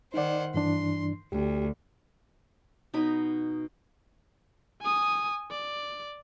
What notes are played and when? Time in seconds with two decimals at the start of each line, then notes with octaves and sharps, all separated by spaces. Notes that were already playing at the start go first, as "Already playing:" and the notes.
0.14 D#3 D#4 C5 D5 F#5
0.54 G2 E3 D4 C6
1.32 D2 G4
2.94 B2 D#4 B5
4.82 G#5 D#6
5.51 D5